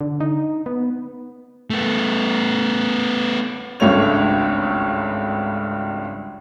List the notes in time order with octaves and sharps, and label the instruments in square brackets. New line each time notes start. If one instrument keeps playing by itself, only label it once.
[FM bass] D3
D#4
B3
[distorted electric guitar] A3 B3
[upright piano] G#1 C#2 G2 A3 C#5 F7